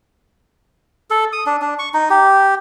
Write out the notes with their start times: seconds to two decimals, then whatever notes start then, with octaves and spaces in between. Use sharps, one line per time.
1.10 A4
1.33 D#6
1.46 D4
1.61 D4
1.79 C#6
1.94 D#4
2.10 G4